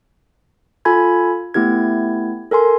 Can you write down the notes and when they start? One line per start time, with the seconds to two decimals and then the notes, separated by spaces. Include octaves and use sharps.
0.85 F4 A4 G#5 B5 G#6
1.54 A3 B3 E4 G4 G#6
2.51 A4 A#4 G#5 C6